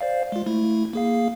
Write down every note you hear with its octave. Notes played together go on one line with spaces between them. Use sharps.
C5 D5 F5
G#3 F4
A3 E4
A#3 G#4 F5